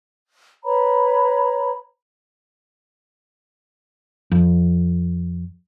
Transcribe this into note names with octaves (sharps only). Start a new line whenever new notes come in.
B4 C#5 A#5 B5
F2